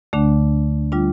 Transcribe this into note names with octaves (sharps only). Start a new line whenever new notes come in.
D2 D3 A3 D4
G3 D4 F4